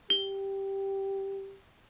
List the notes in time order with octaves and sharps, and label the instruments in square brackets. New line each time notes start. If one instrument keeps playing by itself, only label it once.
[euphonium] G4 [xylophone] G7